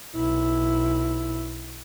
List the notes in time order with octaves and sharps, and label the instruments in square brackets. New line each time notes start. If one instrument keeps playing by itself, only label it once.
[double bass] B1 E4